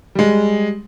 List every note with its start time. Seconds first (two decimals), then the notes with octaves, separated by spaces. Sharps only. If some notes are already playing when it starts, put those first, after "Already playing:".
0.15 G3 G#3